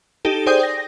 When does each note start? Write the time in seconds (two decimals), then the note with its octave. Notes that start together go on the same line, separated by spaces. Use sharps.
0.25 D#4 G4 A4
0.46 G#4 C5 D5 G5 D#6 G6
0.63 A#6